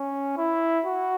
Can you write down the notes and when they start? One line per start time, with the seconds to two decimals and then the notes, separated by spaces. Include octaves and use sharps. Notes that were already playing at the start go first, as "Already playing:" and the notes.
Already playing: C#4
0.37 E4
0.85 F#4